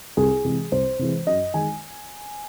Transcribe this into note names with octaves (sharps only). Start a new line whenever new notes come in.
C2 G#4
C3 E3 G#3
C2 C5
C3 E3 G#3
F#2 D#5
D#3 G#3 G#5